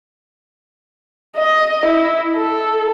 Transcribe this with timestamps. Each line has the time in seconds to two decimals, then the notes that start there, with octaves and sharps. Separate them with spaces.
1.37 D#5
1.85 E4
2.37 A4